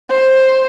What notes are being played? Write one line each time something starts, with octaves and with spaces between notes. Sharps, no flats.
C5